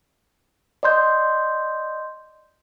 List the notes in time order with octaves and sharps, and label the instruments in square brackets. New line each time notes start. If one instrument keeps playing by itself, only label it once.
[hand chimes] D5 D#5 C6 G6